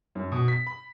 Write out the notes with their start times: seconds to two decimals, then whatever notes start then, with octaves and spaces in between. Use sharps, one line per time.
0.15 F#2
0.32 B2
0.48 B6
0.67 B5